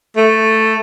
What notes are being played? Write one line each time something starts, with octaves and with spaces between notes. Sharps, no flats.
A3